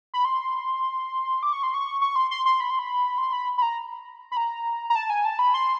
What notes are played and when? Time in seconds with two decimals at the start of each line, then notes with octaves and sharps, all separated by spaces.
0.14 B5
0.25 C6
1.43 D6
1.53 C#6
1.63 C6
1.74 C#6
2.01 C#6
2.16 C6
2.31 C6
2.46 C6
2.60 B5
2.70 C6
2.79 B5
3.18 C6
3.33 B5
3.58 B5
3.62 A#5
4.32 B5
4.37 A#5
4.90 A#5
4.96 A5
5.10 G#5
5.25 A5
5.39 B5
5.54 C6